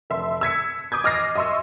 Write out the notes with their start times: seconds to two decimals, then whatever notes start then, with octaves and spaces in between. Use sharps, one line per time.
0.10 F1 E5 C6
0.41 E6 G#6 B6 C#7
0.92 D6 D#6 G6 G#6
1.04 D#5 D6 F6 A6 A#6 C7
1.35 D#5 E5 C6 C#6 E6